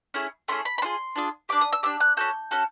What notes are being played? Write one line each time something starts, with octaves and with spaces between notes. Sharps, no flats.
A3 C#4 E4 G#4
A3 C#4 E4 G#4 C6
B5
B5
D4 F4 G#4 C6
D4 F4 G#4
D4 G4 D6
D#6
E6
D4 G4 E6
F#6
C#4 F#4 A4 G6
C#4 F#4 A4